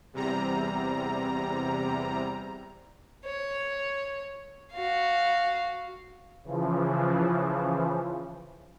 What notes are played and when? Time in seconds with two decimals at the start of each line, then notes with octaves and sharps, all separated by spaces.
0.13 E2 C3 G3 A#5
3.26 C#5
4.73 F#4 F5
6.44 C#3 E3 F3